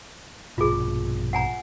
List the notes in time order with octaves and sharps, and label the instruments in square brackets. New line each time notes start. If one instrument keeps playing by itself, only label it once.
[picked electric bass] A#1 G2 B2 [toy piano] F4 G#4
[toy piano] F#5 G#5 A#5